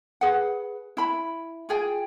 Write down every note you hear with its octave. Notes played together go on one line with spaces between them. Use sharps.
G#4 B4 F#5
E4 B5
F4 G#4 G5